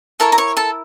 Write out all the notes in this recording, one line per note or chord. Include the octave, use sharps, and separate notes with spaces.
E4 A4 A#4 C#5 A5
A#5
C#5 C#6
A4 A5